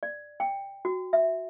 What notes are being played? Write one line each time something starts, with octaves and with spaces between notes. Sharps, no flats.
D5
G5
F#4
E5